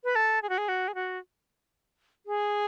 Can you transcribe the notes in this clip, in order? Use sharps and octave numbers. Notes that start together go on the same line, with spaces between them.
B4
A4
G#4
F#4
G#4
F#4
G#4
F#4
G#4